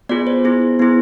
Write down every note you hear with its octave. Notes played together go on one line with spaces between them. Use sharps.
B3 F4 G#4 D5
C5
B3 E4 G#4
B3 E4 G#4